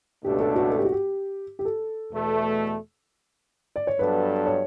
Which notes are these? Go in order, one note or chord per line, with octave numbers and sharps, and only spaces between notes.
C#2 B2 A3 D4 G4
A4
F#4
A4
G4
F#4
G4
G4
A4
E2 B2 A3
D5
C#5
G2 F#3 B3 D4 A4 B4
C#5